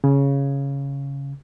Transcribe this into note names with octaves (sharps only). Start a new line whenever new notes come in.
C#3